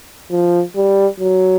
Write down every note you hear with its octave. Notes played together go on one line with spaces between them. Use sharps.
F3
G3
F#3